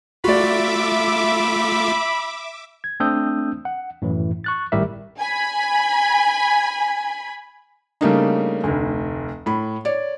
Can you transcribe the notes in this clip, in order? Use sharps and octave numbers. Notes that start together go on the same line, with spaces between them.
A3 F4 F#4 D5 E5 B5 D6
G#6
A3 C4 D4 D#6 E6 G6
F#5
F#2 A2 E3
C#6 F#6 A6
G#1 A2 G3 G4 A#4 E5
G#5 B5
C#3 G3 A3 A#3 D4 D#4
F1 D2
A2 B5
C#5 D5